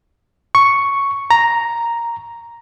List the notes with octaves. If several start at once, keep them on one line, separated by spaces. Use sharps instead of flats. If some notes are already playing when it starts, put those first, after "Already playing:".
C#6
A#5